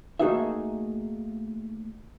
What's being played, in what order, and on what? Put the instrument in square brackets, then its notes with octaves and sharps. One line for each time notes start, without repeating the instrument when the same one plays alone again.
[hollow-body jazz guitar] A3 A#3 D#4 F#4 G#4 E5